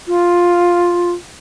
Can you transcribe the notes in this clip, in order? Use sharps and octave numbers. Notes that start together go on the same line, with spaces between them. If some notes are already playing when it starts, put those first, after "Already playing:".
F4